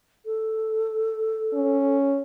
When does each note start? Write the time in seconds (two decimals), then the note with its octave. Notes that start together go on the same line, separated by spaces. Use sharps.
0.26 A4
1.54 C#4